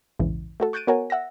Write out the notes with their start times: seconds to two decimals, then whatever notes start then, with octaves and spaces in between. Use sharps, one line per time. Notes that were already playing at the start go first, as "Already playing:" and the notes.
0.19 A#1 E2 G#2 C#3 E3
0.60 A3 F#4 A4
0.73 C#6 F#6 G6 A6 D7 D#7
0.87 B3 F#4 A#4 C#5 F#5 G#5
1.10 E5 F#5 E6 A#6